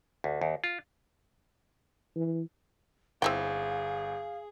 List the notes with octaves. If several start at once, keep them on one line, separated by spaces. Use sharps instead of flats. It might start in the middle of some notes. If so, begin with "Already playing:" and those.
D2
D#2
F4
E3
G1 C4 E4 G#4 F5 G5